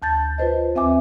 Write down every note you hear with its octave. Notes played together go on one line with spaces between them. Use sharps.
D2 A5 G6 A6
F4 B4 C5 D#5
D#2 C4 E5 G#5 D6